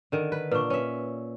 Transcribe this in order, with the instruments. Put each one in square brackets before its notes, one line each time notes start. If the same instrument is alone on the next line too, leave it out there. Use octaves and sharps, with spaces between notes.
[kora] D3 D#3
B4
[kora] A#2 D4 [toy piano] B4 C#6
[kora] C#4 E5